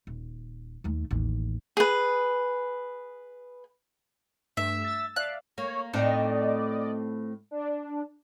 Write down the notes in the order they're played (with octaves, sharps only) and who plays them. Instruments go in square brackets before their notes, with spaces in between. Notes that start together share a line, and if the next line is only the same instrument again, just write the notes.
[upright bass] D#1
D#2 A3
A1 D#2
[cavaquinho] G#4 B4
[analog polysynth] G2 A3 E7 [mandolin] E5
[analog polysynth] E6 A6
[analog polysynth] D5 E5 F5 [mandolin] F#6
[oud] A#3 [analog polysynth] C#5
[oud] A2 C4 D#4 [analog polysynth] D5 D#5
[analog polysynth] D4